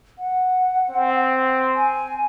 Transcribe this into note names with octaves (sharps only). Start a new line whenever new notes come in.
F#5
C4
G#5